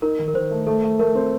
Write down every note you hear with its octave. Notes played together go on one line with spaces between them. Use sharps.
D#4 A#4
D#3
A#4
D#3 C5
A3
A3 A4
A3
A3 A#4
C4